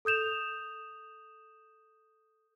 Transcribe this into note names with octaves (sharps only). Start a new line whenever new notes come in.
A4 D#6 G6 E7 F7